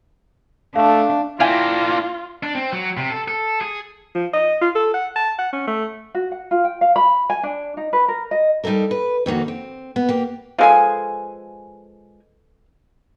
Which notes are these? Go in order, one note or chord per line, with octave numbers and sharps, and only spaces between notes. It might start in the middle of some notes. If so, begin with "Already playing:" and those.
A3 D4 F5
A#3 D4 E4 F4 F5 G5 G#5
D4
C4
F#3
C3
A4
A4
G#4
F3
D#5
F4
A4
F#5
A5
F#5
C#4
A3
F#4
F#5
F4
G5
F5
B5
G#5
D4
D#4
B4
A#4
D#5
G3 D#4 E4 A4 A#4
B4
F2 D#3 A#3 F#4
C4
B3
A#3 G4
F3 G#3 A4 B4 F5 G#5